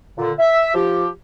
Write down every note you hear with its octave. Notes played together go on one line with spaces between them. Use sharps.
A#2 D3
E5
F3 G4